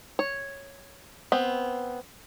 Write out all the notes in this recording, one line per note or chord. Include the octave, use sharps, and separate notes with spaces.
C#5
B3 C4